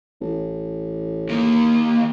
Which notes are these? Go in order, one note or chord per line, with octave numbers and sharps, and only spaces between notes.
A1
D#2 A#3